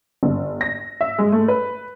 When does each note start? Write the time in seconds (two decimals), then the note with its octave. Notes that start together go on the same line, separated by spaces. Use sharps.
0.23 G1
0.61 A#6
1.01 E5
1.19 G#3
1.32 A3
1.48 B4